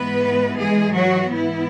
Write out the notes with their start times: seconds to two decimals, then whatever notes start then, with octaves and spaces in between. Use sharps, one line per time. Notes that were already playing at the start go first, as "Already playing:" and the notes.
Already playing: G#2 E3 G#3 B3 B4
0.56 G#3 G#4
0.94 F#3 F#4
1.32 G#2 E3 B3 E4